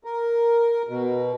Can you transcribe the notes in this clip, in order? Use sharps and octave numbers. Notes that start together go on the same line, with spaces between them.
A#4
B2